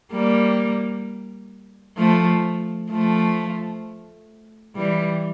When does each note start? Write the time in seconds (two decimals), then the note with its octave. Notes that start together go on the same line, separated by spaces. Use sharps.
0.12 G3 A#3
1.97 F3 A3
2.90 F3 A3
4.75 E3 G3